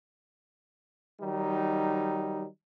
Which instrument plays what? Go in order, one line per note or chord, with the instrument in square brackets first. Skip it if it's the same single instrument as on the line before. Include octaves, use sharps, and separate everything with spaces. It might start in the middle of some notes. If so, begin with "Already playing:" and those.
[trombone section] D#3 F#3 G3 D#4